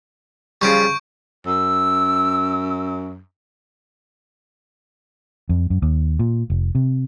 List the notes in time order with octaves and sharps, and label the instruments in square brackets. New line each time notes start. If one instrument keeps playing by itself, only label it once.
[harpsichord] C#3 F3 G3 [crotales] C#6 G6 D7
[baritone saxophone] F#2 [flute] E6
[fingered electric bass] F2
F#2
D#2
A#2
F1
C3